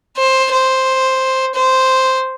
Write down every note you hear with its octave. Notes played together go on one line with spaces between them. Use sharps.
C5
C5
C5